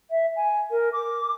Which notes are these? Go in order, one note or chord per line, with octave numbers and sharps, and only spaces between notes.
E5
G#5
A#4
D6